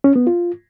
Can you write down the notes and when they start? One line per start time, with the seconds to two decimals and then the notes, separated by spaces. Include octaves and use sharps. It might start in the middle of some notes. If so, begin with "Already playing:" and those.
0.04 C#4
0.16 B3
0.27 F4